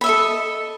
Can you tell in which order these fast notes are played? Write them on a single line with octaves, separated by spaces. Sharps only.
B5 E5 D#5 A4